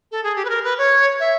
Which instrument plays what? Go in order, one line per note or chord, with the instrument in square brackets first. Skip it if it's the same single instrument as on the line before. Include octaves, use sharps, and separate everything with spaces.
[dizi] A4
G#4
G4
B4
A#4
B4
C#5
E5